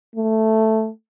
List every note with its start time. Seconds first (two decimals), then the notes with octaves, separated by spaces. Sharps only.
0.16 A3